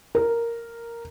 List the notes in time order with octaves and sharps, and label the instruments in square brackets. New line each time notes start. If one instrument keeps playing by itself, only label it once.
[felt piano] A#4